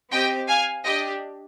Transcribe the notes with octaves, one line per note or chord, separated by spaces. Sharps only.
C4 G4 D#5 G5
F5 G#5
D4 G4 D#5 G5